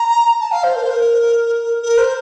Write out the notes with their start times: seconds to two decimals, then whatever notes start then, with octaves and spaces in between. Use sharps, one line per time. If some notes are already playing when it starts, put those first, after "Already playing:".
Already playing: A#5
0.40 A5
0.52 F5
0.64 C5
0.76 A#4
0.83 C5
0.90 A#4
1.82 A#4
1.98 C5